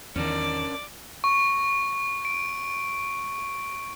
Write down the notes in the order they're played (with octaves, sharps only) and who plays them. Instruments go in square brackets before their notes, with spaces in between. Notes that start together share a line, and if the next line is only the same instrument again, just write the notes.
[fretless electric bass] E2 D#3 [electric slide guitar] C#4 D4 A#4 [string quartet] D5
[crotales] C#6
D7